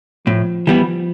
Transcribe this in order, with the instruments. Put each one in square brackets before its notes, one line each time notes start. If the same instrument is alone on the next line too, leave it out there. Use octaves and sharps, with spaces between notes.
[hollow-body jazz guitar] A2 [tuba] F3
[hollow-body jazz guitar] E3 G3 B3